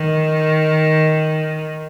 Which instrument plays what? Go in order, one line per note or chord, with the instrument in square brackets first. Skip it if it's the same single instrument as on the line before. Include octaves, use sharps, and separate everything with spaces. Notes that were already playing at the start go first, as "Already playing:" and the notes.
Already playing: [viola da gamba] D#3